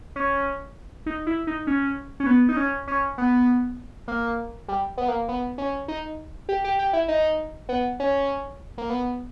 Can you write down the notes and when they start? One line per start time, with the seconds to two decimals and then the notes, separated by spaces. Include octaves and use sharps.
0.16 C#4
1.06 D#4
1.27 E4
1.47 D#4
1.67 C#4
2.20 C#4
2.26 B3
2.49 D#4
2.57 C#4
2.88 C#4
3.18 B3
4.08 A#3
4.68 G3
4.98 B3
5.08 A#3
5.28 B3
5.58 C#4
5.88 D#4
6.49 G4
6.64 G4
6.79 G4
6.93 E4
7.08 D#4
7.69 B3
8.00 C#4
8.78 A#3
8.90 B3